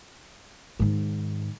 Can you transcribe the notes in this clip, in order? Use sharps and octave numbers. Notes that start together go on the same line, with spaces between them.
G#2 D#3